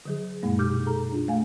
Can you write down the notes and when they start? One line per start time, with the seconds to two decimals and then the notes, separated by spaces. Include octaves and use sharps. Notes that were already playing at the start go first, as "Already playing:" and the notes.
0.06 D3 F#3 G#4
0.43 F#2 A#2 G#3 A#3
0.58 B2 D#4 G4 D6 F6 G6
0.86 G#4 A4 A#5
1.12 D4 F4
1.28 A3 F5 G#5